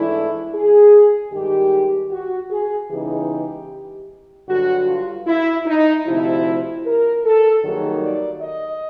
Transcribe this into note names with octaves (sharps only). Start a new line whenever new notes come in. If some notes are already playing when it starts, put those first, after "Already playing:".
Already playing: G#2 E3 A3 D4 E4
G#4
G2 D#3 G#3 G4
F#4
G#4
C#3 E3 G#3 B3 D#4 G4
G2 D3 F#3 F#4
F4
E4
D#4
D2 C3 F3 E4
A#4
A4
G2 D#3 F#3 A#3 D#4 G#4
D5
D#5